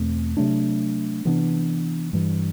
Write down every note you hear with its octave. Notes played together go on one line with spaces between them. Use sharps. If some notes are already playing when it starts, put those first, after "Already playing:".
Already playing: E2 B2 A3 C4
C3 F#3 A3 D4
C3 E3 B3 D4
G2 E3 G3